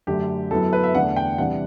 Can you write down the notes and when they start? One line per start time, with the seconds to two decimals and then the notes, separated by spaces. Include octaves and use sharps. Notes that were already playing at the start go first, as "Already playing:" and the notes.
0.07 F#2 D3 A3 D4 G4
0.51 F#2 F#3 B3 E4 A4
0.73 B4
0.83 E5
0.95 E2 D3 A3 D4 F#5
1.16 G5
1.38 C3 E3 G3 D4 F#5